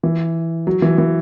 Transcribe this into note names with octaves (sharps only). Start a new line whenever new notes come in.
E3
F#3
E3
E3